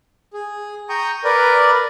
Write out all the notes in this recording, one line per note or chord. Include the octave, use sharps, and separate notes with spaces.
G#4
G5 A#5 C#6 D#6
A#4 B4 D5